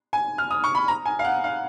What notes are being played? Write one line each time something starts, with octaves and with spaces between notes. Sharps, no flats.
G#5
F6
D#6
C#6
B5
A#5
G#5
F5
F#5
F5